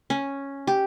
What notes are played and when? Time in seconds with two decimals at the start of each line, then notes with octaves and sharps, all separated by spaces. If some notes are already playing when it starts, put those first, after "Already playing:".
0.10 C#4
0.67 G4